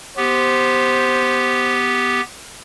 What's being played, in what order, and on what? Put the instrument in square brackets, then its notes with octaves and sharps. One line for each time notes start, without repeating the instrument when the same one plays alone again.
[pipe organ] B3 G4 [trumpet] C5